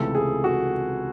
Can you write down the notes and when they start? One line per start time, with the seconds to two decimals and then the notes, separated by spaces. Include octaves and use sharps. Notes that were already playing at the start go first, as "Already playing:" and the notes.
Already playing: C#2 C3 E3 A3 A4
0.15 G#4
0.44 F#4